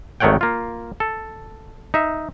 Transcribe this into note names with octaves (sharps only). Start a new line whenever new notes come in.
G#1 D#3 A3 C#5 F#5 G5
A#3 F4
A4
D#4 E5